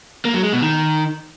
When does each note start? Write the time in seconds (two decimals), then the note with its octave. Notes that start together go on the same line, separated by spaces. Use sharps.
0.25 A#3
0.34 F#3
0.43 G#3
0.52 B2
0.61 D#3